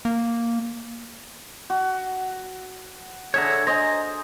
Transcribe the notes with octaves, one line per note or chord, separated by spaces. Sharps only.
A#3
F#4
D3 G#4 A4 C#5 E5 A#5
C5 D#5 G#5 A#5